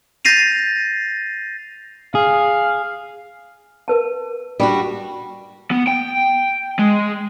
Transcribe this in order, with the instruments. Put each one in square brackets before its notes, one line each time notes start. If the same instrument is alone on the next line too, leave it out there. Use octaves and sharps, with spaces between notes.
[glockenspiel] G6 A6 A#6 C7 D#7 F7
[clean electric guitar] G#4 [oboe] F5
[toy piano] A#4 B4 A5
[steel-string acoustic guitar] G3 D4 F#4
[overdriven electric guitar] B3
G5
G#3